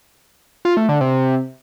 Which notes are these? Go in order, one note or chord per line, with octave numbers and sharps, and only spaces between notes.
F4
A3
D3
C3